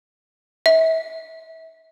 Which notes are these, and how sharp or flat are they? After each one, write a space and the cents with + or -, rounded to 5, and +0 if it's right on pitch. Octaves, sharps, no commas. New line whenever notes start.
E5 -30